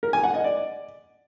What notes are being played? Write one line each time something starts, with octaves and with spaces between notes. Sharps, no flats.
A#4
G#5
F#5
D#5
D5